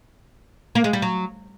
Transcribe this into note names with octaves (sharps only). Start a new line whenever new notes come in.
A#3
G#3
G3
F#3